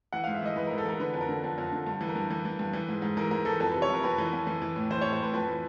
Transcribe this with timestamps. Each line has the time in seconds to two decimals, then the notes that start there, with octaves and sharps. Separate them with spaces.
0.13 E3 F#5
0.24 G#2 F5
0.35 E5
0.42 E3 D#5
0.56 E3 B4
0.67 G#2 A#4
0.78 A4
0.86 E3 A#4
1.00 D3 B4
1.14 F2
1.21 A#4
1.29 D3
1.44 F2
1.58 F2
1.72 D3
1.86 G2
2.01 E3
2.08 A#4
2.16 G2
2.30 E3
2.45 E3
2.59 G2
2.73 E3
2.88 G#2
3.02 G#2
3.17 E3 A#4
3.31 G#2 A#4
3.45 E3 A4
3.60 F2 A4
3.71 C3 B4
3.82 C#5
3.89 F2 A#4
4.03 F2 B4
4.18 E3
4.33 F2
4.47 E3
4.62 E3
4.76 A2
4.90 E3 C5
5.01 A2 C#5
5.13 C5
5.20 A2 B4
5.34 F2 B4
5.48 E3